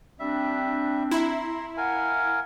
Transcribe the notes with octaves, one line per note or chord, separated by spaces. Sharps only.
G3 C4 D4 E5
E4 A#5 C6
A#4 F5 F#5 G#5